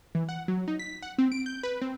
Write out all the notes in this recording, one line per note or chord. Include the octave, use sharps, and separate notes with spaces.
E3
F#5
F#3
D#4
B6
F#5
C4
D7
G6
B4
C4